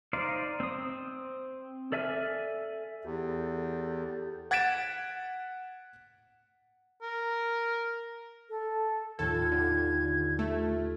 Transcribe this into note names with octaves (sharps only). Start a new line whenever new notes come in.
D#4 C5 D5 F5
C4 D#6
A4 D5 E5 G#5 F6
E2 G4 A4
F#5 G#6 A6 B6 D7 E7
A#4
A4
D#2 A2 F4 A4 F5 G#6
D3
A3 F4 A4 E5